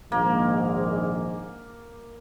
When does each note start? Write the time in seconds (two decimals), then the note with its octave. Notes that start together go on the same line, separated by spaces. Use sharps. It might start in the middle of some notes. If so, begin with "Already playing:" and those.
0.12 A#1 G#2 D#3 A#3